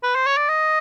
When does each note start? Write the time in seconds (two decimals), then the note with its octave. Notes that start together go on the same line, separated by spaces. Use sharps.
0.03 B4
0.15 C5
0.26 C#5
0.37 D5
0.49 D#5